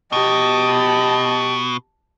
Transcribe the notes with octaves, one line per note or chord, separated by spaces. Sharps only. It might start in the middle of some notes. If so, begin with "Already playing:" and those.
B2 G4 D#5 A5